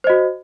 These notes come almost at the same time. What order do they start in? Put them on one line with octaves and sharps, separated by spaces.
C5 D#5 F#4